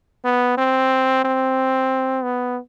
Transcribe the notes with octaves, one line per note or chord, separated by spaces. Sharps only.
B3
C4
C4
B3